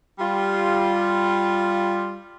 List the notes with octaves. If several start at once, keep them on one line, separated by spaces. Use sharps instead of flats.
G3 F4